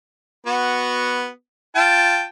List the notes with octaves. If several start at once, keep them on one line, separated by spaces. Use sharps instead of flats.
B3 F#4
F4 G5 A5